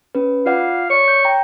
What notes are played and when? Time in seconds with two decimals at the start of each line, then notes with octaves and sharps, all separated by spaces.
0.15 C#4 B4
0.46 F4 D5 F5 F#5
0.90 C#5 D5 C#6
1.08 G6
1.25 G5 A#5